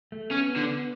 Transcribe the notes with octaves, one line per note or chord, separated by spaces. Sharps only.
A3
B3 C#4
D3